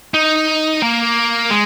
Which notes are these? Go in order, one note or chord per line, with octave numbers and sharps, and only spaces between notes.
D#4
A#3
G#3